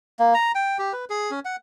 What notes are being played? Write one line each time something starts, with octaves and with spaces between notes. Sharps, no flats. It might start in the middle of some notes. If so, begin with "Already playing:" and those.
A#3
A#5
G5
G4
B4
G#4
C#4
F#5